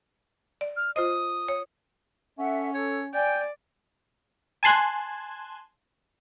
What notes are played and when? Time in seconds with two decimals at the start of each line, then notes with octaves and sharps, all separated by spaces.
0.61 D5
0.77 F6
0.96 F4 C5 D#5 D#6
1.48 C#5
2.38 C#4 A4 E5 F#5
2.74 A4 C#5
3.14 D5 G5 G#5
4.63 G#5 A5 C6 F#6 G#6